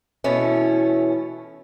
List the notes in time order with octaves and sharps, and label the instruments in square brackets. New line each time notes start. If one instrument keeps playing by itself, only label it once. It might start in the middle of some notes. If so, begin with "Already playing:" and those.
[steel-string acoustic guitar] B2 E3 A3 C#4